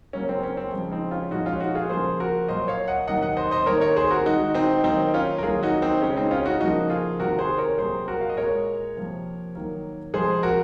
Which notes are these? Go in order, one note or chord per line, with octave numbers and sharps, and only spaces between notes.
C#3 F#3 A#3 C#4
C4
C#4
C4
C#3 F3 G#3
C4 D#4
C#4 F4
A#2 F3 G#3 D#4 F#4
C#4 F4
D#4 F#4
F4 G#4
C#3 F3 A#3 G#4 C5
F#4 A#4
A#2 F#3 A#3 C5 D#5
C#5 F5
D#5 F#5
C3 D#3 F#3 A#3 D#5 F#5
D#5 F#5
C5 D#5
C5 D#5
D#3 A#3 A#4 C#5
A#4 C#5
G#4 C5
F#4 A#4
D#3 G#3 D#4 F#4
C4 D#4
D#3 F#3 A#3 C4 D#4
C#4 F4
A#4
D#3 F#3 A#3 F4 G#4
D#4 F#4
C4 D#4
C#3 G#3 C#4
C4 D#4
C#4 F4
D#4 F#4
C#3 F3 A#3 D#4 F#4
F4 G#4
C3 D#3 A#3 F#4 A#4
G#4 C5
A#4 C#5
C3 F#3 A#3 G#4 C5
F#4 A#4
F5
D#5
A#2 G#3 A#4 C#5
C3 F3 A#3
D#3 F#3 A#3
C3 F3 G#3 G#4 C5
F#4 A#4